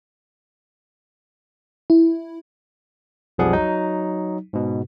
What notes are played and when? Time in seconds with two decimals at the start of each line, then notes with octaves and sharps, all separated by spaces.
1.90 E4
3.38 B1 F2 F3 G3 G#4 F#5
3.53 F#3 D#4
4.53 G#2 B2